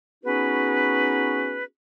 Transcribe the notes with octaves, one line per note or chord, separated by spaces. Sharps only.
B3 C#4 D#4 F#4 G#4 B4